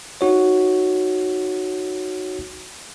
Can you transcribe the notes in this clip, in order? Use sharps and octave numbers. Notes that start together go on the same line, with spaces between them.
D#4 F#4 C#5